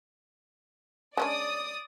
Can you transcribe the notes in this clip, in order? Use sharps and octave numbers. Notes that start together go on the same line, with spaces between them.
G#3 C#4 D4 D5 D#6